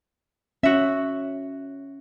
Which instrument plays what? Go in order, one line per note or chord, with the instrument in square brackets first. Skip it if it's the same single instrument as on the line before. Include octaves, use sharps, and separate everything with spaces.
[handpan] C#4 [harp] F#4 E5